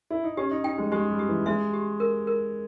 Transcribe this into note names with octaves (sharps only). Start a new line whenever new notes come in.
E4
D#4
C#4 G4
D#4
D#4 G5
G#3
G#3 G4
G3
G4
E3
G#3 E5
G4
A#4
A#4